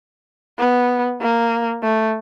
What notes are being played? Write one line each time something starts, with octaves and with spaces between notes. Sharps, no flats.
B3
A#3
A3